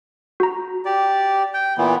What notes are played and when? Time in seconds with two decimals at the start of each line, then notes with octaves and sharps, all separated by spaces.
0.40 F#4 A#5
0.85 G4 D5
1.54 G5
1.78 A#2 E3 B3 E4